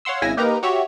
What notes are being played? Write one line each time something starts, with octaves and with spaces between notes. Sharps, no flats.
C#5 F5 F#5 C6 E6
G#1 C#3 E4 G#5 E6 A#6
A#3 D#4 G4 A#4 B4 A#5
F#4 G4 C#5 E5